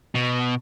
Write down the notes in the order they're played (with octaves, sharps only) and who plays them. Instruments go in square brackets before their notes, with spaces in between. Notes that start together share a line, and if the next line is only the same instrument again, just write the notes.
[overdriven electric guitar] B2